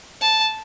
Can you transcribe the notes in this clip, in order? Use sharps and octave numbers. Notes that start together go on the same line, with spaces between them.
A5